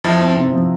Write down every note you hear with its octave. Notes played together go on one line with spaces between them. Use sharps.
F2 F3 E4
C4
C3
F3